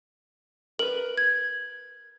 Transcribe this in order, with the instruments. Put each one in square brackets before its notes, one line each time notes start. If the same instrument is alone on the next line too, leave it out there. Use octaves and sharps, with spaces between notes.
[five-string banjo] A#4 B4 [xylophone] F#7
[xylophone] G#6